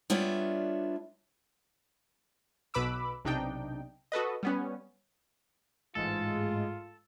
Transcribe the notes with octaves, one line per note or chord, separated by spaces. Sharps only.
G3 B3 D4 F4 C#5 E5
B1 B2 B4 B5 D6 E6
B1 C3 D4 D#4 G5
F#4 A4 B4 D#5
G3 B3 C#4
A1 G#2 G#3 F4 A4